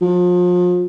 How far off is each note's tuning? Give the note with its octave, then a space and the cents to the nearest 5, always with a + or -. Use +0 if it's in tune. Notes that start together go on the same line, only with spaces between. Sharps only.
F3 +35